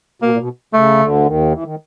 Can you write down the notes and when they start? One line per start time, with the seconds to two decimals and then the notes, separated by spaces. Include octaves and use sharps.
0.22 B2 A#3
0.30 A#2
0.38 B2
0.73 C#3 A3
0.99 D2 D3
1.25 D#2 D#3
1.52 E3
1.63 D#3